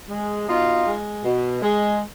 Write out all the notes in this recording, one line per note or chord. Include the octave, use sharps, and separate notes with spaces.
G#3
B2 D#4 F4
G#3
B2
G#3